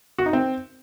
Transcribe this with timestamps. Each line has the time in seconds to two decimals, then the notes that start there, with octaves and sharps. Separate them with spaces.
0.18 F#4
0.26 D#4
0.33 C4